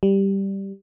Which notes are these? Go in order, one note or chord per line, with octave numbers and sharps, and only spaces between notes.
G3